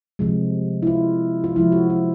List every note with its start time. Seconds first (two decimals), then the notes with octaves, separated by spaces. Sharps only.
0.19 C3 F3 G#3
0.82 E4
0.87 F4
1.44 F4
1.56 C3 F3 G#3 E4
1.72 F#4
1.90 F4